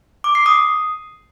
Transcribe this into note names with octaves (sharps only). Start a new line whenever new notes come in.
D6
C7
D#6